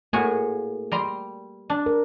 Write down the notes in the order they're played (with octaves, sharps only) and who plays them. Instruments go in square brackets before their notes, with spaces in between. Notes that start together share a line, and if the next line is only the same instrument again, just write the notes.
[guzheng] A2 F#4 G#4 [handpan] A#3
[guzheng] G3 A#5 C6
D4
[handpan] A#4